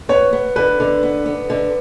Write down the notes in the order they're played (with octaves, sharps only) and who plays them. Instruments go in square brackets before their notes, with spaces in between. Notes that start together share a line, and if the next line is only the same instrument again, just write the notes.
[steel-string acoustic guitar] B3 [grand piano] C#5
[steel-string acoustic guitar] B3
[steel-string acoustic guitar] D3 [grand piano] B4
[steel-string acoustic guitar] D3
B3
B3
D3